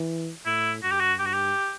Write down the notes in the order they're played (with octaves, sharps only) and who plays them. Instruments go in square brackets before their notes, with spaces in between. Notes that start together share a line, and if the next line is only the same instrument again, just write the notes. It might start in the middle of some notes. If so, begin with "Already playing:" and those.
Already playing: [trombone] E3
[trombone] A2 [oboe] E4
[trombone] F#2 [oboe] F#4
[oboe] G4
F#4
[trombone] G2 [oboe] G4
[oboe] F#4
G4